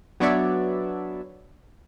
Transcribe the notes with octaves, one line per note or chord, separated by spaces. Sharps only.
F#3 B3 D4 C#5 D5 E5